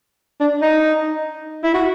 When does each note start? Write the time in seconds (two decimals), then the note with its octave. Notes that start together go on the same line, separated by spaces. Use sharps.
0.40 D4
0.62 D#4
1.63 E4
1.74 F#4